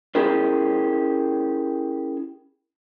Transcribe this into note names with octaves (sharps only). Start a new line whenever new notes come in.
C#4 E4 G4 G#4 A#4